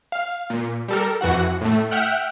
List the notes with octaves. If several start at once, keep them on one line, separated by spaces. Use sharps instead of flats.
F5
A#2
G3 A4 A#4
F2 E3 F#4 F#5
A2 A3
E5 F#5 G5 F6 F#6